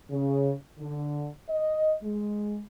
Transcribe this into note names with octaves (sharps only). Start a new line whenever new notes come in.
C#3
D3
D#5
G#3